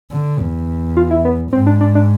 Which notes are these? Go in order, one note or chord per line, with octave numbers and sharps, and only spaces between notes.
D3
E2
F4
E4
B3
G#2 C4
D4
D4
D4